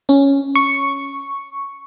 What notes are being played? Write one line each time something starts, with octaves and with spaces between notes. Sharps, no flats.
C#4
C#6